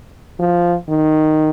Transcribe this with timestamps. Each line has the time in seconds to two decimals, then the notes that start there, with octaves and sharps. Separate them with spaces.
0.40 F3
0.89 D#3